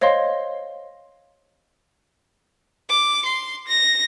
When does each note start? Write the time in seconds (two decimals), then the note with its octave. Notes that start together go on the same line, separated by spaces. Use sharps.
0.01 C5 C#5 D#5 F5 C6
2.90 D6
3.26 C6
3.68 A#6